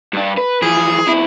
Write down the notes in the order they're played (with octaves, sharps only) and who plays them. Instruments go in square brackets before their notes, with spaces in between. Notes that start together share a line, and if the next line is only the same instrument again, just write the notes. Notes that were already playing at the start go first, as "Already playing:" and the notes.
[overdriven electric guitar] G2 D4
B4
[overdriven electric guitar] E3 F3 [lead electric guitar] G#4
[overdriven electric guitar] F2 E4